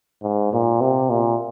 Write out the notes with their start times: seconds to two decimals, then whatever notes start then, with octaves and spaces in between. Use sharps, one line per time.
0.23 G#2
0.53 A#2
0.81 C3
1.10 A#2